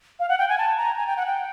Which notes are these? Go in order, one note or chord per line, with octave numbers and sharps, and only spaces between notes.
F5
F#5
G5
G#5
A5
A#5
G#5
G5
F#5
G5